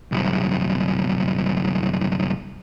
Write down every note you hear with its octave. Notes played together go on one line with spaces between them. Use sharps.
C2 F#2